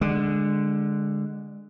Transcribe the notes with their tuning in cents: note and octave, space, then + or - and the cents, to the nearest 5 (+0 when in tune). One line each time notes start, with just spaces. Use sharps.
D3 +10 G#3 -10